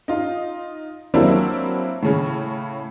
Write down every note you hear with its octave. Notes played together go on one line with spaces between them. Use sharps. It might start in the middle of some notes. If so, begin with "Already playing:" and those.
D#4 F4
F#3 G3 A#3 C4 D4 E4
A2 C#3 C#4